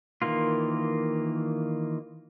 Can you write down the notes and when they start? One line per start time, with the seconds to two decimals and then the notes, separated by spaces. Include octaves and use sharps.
0.22 D#3 E3 A#3 F4